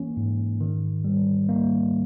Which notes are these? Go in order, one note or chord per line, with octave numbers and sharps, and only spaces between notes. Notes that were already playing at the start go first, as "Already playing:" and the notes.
Already playing: E3 A#3 C#4
G#2
D#3
G3
A#3